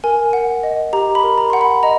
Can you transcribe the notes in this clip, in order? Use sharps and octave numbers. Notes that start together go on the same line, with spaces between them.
A#4 G#5
F#5
D#5
G4 A#5
B5
A#4
A#5
F#5 C6
B5
D#5 A#5